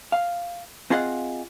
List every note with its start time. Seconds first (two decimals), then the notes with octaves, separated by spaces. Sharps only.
0.12 F5
0.90 C4 F4 G#4 D#5 F5 F#5